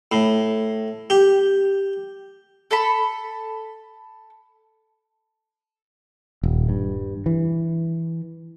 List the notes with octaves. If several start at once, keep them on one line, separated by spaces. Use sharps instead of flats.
A2
G4
A4 A5 B5
D#1
G2
E3